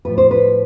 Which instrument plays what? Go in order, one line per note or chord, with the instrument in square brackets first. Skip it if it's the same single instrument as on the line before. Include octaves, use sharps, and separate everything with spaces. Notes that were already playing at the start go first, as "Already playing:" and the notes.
[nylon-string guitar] A2 F3 B4
C5
B4